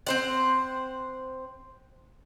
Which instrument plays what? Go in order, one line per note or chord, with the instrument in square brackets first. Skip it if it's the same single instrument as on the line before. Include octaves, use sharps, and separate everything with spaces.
[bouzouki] C4 C5 F#5